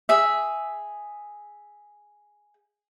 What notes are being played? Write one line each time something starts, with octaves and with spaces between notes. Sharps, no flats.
G#4 E5